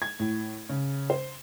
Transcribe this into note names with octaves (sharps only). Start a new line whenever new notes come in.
G#6
A2
C#3
C5